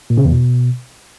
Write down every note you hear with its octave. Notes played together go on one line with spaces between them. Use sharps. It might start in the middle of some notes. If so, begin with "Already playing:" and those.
A#2
C#3
E2
B2